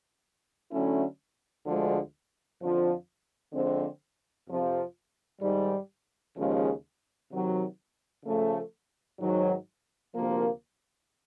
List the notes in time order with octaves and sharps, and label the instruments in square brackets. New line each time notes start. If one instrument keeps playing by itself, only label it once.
[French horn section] D3 F#3 A3 C#4 E4
D2 D3 F3 G#3
F2 D3 F3
D3 F3 G#3 C4
F2 C3 F3
G#2 D#3 G3
D#2 C#3 F3 G#3 C#4
C3 D#3 F#3
C#3 F3 A3
G#2 D#3 F#3
D2 C3 F3 A#3